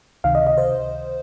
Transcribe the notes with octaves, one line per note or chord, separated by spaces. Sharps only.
C#2 C3 D#3 F5
D#5
D#5
C5